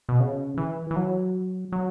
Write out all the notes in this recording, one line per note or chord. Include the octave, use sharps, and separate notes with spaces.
B2
C#3
E3
E3
F#3
F#3